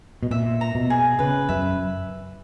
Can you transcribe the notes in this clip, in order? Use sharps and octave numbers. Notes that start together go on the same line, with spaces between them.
B2
A#2 E5
A#5
B2
G#4
C#3 B4
F#2 E5